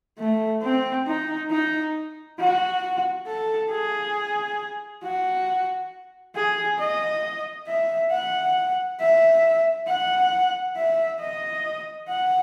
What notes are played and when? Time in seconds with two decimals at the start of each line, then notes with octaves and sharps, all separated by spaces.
0.19 A3
0.63 C4
1.07 D#4
1.51 D#4
2.39 F#4
3.27 A4
3.71 G#4
5.03 F#4
6.36 G#4
6.79 D#5
7.67 E5
8.11 F#5
9.00 E5
9.87 F#5
10.76 E5
11.20 D#5
12.08 F#5